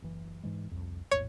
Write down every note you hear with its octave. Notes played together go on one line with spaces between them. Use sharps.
F#1 E3
G#2 E3 G#3
C2 F2
A#1 E2 A2 C#5